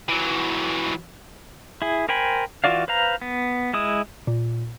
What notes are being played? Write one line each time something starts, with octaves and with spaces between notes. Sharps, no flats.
E3 F#3
E4 G#4
A#4 C5 G5 G#5 B5
E3 F4 F#4 D5 F5
B4 C5 F5 A#5
B3
G#3 E4 D#6
A#2